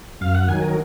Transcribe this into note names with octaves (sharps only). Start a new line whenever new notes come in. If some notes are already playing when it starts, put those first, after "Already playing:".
F#2 F5
F#5
D#3 F#3 G#5
A#4